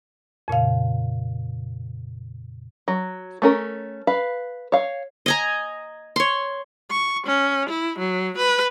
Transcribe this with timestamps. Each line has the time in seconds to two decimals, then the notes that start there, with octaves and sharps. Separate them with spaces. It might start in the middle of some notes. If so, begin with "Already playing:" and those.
0.48 F2 A#2 C#3 F5
2.88 F#3
3.42 A3 C#4 A#4
4.07 B4 F5
4.72 C#5 F5
5.26 D#5 G#5 A#5
6.16 C#5 C6
6.90 C#6
7.26 C#4
7.69 E4
7.98 F#3
8.37 B4